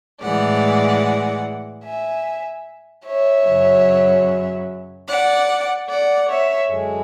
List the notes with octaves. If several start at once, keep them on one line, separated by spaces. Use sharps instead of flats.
A2 E3 G#3 D5 F#5
E5 G#5
C#5 E5
F#2 C#3 F#3
D5 F#5
D5 F#5
C#5 E5
F#2 D3 G#3